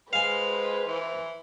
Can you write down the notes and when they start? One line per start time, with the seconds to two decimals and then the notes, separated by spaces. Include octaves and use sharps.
0.13 G#3 B4 C5 F5 G#5
0.86 E3